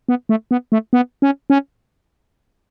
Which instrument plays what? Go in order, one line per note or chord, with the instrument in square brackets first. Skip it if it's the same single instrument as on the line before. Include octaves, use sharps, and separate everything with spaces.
[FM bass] B3
A3
B3
A3
B3
C#4
C#4